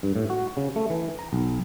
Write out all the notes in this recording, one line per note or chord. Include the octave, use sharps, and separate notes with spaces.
G2
A2
F#4
C#3
A3
E3
A#5
B1